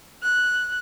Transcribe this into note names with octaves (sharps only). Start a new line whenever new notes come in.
F#6